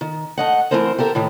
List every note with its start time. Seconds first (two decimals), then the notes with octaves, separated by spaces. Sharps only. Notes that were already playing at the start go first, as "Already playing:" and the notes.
0.01 D#3
0.38 A3 D#5 F#5
0.71 E3 F3 A3 C4 A#4 C5
0.98 G4 A4 A#4 E5
1.15 A2 D#3 E3